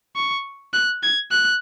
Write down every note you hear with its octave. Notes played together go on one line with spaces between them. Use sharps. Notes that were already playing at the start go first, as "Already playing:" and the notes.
C#6
F#6
G#6
F#6